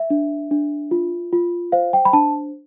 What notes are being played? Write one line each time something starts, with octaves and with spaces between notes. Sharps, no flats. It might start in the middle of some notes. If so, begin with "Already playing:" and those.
Already playing: E5
D4
D4
F4
F4
C5 F5
G5
B5
D4 A5